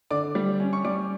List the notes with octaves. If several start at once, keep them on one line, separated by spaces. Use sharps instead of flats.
D3 D5 D6
G3
C#4
C#6
G3 D5 D6